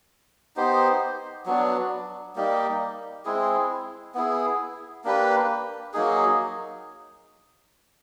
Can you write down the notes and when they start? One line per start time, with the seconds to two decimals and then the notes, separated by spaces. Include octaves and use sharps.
0.56 B3 D#4 G4 C5
1.46 F#3 B3 D4
2.36 G3 A#3 D#4 G4
3.25 G#3 C4 E4 G#4
4.15 B3 E4 G#4
5.04 A#3 D4 G4 B4
5.94 F#3 A#3 D#4 G#4